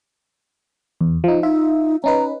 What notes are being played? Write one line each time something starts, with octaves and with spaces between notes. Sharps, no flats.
E2
F3 D#4
D#4 F4 E5
C#4 D#4 B4 A#5